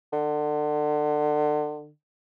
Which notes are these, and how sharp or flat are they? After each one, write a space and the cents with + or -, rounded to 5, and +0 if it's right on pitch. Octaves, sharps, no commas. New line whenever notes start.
D3 +30